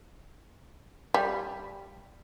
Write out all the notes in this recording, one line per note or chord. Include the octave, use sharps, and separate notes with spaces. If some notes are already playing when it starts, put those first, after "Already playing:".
G3